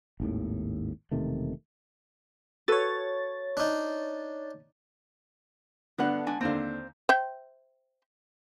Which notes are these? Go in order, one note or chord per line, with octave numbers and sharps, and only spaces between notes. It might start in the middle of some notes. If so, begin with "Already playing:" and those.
G#1 D#2 A2
E1 C3 D#3 A3
F#4 A4 B4 C#5 A6
D4 D#4
G2 D3 A3 B3 D4 F#5
G#3 D4 G#5
D#2 D3 C4 C5 F5
C5 E5 G5